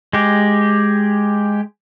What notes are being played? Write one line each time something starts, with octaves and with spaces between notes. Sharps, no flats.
G#3 G4